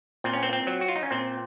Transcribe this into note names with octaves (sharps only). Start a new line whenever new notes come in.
A#2 C4
C#4
C4
C4
F#3
F#4
F4
D#4
C#4
A#2 C4